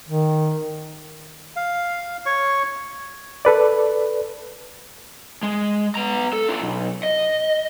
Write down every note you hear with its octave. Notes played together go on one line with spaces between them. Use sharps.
D#3
F5
C#5 C#6
A4 B4 D5
G#3
B3 A#5
A4
D4 F4
B1
D#5